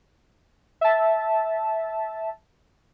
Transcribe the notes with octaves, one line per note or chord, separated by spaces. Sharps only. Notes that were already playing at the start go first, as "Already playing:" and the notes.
E5 A5